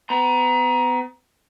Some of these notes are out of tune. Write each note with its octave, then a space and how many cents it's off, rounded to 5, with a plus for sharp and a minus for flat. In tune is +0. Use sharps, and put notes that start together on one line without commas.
B3 +35 A#5 +20